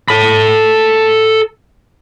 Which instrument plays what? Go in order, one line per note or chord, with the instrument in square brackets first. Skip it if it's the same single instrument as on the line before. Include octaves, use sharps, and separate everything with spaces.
[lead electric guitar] A4 B5